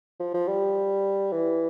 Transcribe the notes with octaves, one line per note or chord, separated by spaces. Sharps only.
F3
F3
G3
E3